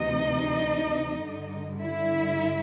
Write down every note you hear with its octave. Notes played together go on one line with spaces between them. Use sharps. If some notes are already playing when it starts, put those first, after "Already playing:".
Already playing: D2 C3 E3 D#4 D#5
G2 D3 G3
E4 E5